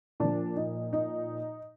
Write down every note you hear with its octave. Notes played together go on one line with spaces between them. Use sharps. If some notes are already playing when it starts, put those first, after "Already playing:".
A#2 F3 D4
D#4
D#4